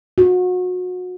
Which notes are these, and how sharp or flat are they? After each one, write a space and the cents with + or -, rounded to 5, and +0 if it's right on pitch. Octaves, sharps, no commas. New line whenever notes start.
F#4 -30